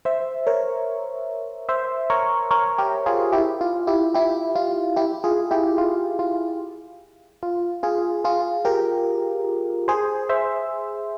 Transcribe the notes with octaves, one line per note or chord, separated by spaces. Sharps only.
C5 E5
A#4 C#5
C5 E5
A#4 C#5
A#4 C#5
G4 A#4
F4 G#4
E4 G4
F4
E4 G4
E4 G4
F4
E4 G4
F4 G#4
E4 G4
F4
F4
F4
F4 G#4
F4 G#4
G4 A#4
G#4 C5
C5 E5